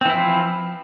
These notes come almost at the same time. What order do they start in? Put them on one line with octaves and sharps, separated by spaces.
C4 E3 E4 F3